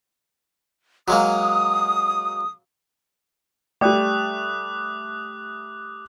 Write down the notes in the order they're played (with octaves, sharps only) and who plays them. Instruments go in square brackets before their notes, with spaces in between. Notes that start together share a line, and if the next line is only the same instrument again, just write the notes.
[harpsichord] F#3 G#3 A#3 [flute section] D#6
[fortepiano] G3 A3 [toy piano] D5 G5 [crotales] D6 D#6 F#6